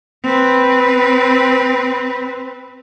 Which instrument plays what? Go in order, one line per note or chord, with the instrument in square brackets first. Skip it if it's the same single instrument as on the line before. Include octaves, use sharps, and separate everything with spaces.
[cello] C4 B4